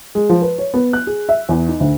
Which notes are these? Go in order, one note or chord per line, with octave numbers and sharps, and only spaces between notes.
G#3
F3
B4
C#5
B3
F#6
G#4
E5
E2
D#4
D2